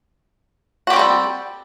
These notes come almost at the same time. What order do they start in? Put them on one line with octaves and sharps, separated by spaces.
F#4 G4 C4 G3 A4